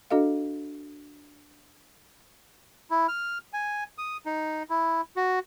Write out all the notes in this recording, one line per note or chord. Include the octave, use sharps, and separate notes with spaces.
D4 F#4 A4 D#5 F5
E4
F6
G#5
D#6
D#4
E4
F#4